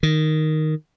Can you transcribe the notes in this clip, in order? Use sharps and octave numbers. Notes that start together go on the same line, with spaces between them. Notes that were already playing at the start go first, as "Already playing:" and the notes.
D#3